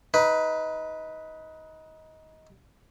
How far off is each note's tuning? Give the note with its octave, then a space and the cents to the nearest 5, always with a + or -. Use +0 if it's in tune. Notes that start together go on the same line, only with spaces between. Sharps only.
D#4 +20 B4 +0